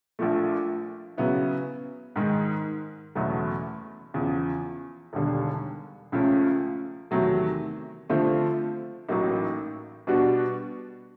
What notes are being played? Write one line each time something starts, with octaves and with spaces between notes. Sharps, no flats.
A#1 A#2 F3 A3
C#3 F#3 B3 E4
G#2 D#3 G#3
F#1 E2 B2 F#3 A3
E2 C#3 F3
E1 D#2 D3 G3
C#2 C#3 F3 A3 C#4
E2 C3 D#3 F#3 A3
D3 F3 A3 C4 F4
A1 A2 F#3 A#3 D#4
B2 G3 B3 D4 F#4